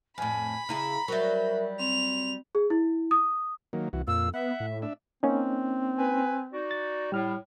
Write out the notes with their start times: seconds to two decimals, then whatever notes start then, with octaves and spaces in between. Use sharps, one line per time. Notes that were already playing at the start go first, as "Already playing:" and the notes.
0.18 F2 A2 G#5 B5
0.69 C#3 E4 G#4 A#5
1.08 F#3 G3 A#4 C5 E5
1.79 C4 C#5 F7
2.55 G#4
2.70 E4
3.11 D#6
3.73 D#3 F#3 A#3
3.93 C2 E3 F#4
4.07 F2 A#2 F4 E6
4.34 B3 E5 F#5
4.60 A2
4.82 D4 E5
5.23 A#3 C4 C#4 D#4
5.99 B4 G#5
6.53 D#4 F#4 D5
6.71 A6
7.12 A2 G3 F6